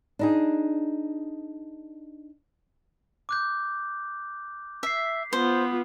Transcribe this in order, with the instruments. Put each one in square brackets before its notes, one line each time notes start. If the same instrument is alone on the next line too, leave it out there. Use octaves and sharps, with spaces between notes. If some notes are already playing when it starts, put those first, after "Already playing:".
[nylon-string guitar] D4 D#4 G#4
[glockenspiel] D6 F#6 G6
[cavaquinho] E5 [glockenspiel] B6 C7
[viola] B3 F4 [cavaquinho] C5